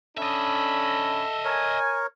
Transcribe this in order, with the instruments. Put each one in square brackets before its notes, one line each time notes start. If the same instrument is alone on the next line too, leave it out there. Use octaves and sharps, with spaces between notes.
[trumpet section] C#4 D4 B5 [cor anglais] A4 [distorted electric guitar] D#5 E5
[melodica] A#4 C#5 [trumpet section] G#5